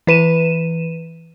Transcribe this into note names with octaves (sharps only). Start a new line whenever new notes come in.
E3 B4 D#7 E7